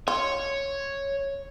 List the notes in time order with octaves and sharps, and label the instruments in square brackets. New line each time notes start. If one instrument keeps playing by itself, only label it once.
[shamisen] F4 [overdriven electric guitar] C#5